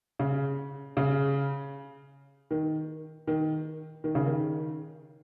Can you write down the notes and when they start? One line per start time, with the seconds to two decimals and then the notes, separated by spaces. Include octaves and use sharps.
0.19 C#3
0.97 C#3
2.51 D#3
3.27 D#3
4.04 D#3
4.15 C#3
4.26 D#3